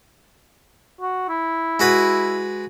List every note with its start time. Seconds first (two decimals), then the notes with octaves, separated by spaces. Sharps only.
1.01 F#4
1.29 E4
1.80 G#3 F#4 B4